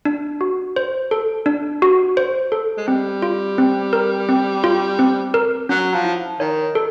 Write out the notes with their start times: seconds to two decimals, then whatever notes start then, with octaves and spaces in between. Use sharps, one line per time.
0.05 D4
0.41 F#4
0.76 C5
1.11 A4
1.46 D4
1.82 F#4
2.17 C5
2.52 A4
2.77 G#3
2.88 G3 C4
3.22 F4
3.58 C4
3.93 A#4
4.29 C4
4.64 F4
4.99 C4
5.34 A#4
5.69 F#3 C#4
5.94 F3
6.04 E4
6.40 D#3 C#5
6.75 A4